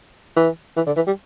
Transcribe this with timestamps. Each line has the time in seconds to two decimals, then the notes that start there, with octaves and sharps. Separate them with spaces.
0.37 E3
0.76 E3
0.87 D3
0.96 E3
1.07 G3